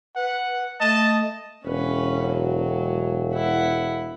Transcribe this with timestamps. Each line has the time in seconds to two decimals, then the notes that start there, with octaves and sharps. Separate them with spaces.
0.16 B4 F#5
0.80 A3 D#5 A5
1.65 E1 C#4 B4
2.26 F#3
3.34 E4 F#5